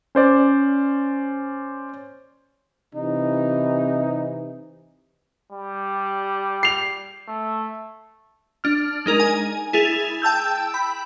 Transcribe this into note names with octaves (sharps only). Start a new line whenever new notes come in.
C#4 C5 D5
C3 E3 D#4
G3
C7 F7
A3
D4 F6
G#3 D#4 A#4
G#5
E4 G#4 A6 F7
G5 A5 E6 G6
B5